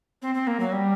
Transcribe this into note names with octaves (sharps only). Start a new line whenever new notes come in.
C4
C4
A#3
F#3
G3